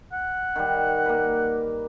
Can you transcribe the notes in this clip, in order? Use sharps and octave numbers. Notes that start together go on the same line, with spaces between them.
F#5
D#3 G3
A#3 B4